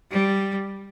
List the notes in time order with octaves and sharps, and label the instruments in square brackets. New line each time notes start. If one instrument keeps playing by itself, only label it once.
[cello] G3